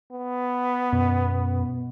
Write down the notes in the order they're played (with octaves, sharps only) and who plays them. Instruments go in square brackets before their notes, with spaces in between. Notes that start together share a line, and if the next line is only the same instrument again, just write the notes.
[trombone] B3
[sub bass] F#2 [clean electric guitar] B2